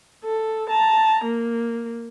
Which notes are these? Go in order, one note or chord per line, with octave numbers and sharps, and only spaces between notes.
A4
A5 A#5
A#3